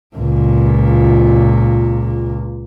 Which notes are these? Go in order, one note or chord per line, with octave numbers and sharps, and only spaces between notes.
C#2 A#2